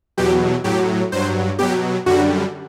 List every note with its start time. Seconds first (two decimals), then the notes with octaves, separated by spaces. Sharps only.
0.17 E2 B2 F#3 G4
0.64 A2 F#3 G4
1.12 G2 F#3 C5
1.59 B2 F#3 G4
2.06 F#2 D3 G3 F#4